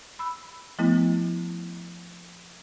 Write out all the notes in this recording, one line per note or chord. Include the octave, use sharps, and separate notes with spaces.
B5 E6
F3 A3 B3 E4